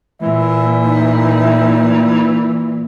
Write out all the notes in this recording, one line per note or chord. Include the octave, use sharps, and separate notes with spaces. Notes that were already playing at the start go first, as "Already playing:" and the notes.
A#2 E3 E5
D#4